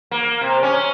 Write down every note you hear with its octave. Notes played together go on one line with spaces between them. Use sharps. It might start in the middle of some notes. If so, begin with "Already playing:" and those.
A#3
C3
C#4